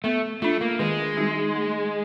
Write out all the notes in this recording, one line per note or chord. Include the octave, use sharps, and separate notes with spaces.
A3 B3
A3 D4 F4
A#3
D#3 G#3
G3 C4 D#4 F#4
A3